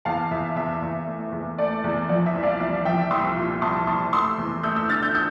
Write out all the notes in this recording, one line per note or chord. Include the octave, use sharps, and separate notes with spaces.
E2 F5 A5
E2 E5
E2 E5
E2
A3
E2
A3 D5
E2
F3 D5
E5
C2
D5 F5
C2 E5
F3 E5 G5
C2 C6 E6
A#2
C2 A5 C6
C2 A5 C6
A3 C6 E6
E2
A3 E6 G6
E6 G6
D3 F6 A6
E6 G6
D3 E6 G6